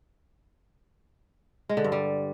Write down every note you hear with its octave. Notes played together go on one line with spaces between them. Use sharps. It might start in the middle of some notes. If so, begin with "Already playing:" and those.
G#3
D3
G2
G3